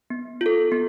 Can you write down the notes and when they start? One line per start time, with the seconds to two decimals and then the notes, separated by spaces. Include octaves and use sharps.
0.10 B3
0.41 F4 A4
0.72 B3